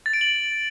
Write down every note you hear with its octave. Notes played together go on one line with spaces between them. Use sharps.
A6
D7
F#7